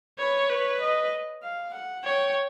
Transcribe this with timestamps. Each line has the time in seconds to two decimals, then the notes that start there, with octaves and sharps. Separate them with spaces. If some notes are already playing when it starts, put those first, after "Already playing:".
0.18 B4 C#5
0.50 B4 C#5
0.80 D#5
1.43 F5
1.73 F#5
2.04 C#5 G5